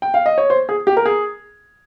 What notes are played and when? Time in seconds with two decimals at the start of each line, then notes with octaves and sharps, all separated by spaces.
0.02 G5
0.14 F5
0.26 D#5
0.38 C#5
0.50 C5
0.69 G#4
0.87 G4
0.97 A#4
1.06 G#4